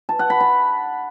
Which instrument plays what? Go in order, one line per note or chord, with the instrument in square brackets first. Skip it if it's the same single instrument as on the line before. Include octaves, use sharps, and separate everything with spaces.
[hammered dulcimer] A5
F#5
B5
A5